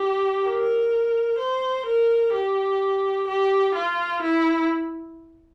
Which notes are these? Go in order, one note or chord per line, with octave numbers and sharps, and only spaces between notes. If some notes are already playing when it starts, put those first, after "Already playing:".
Already playing: G4
A#4
C5
A#4
G4
G4
F4
E4